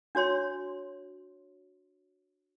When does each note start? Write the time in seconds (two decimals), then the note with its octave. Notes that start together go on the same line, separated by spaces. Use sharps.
0.15 D4 F#4 C#5 C6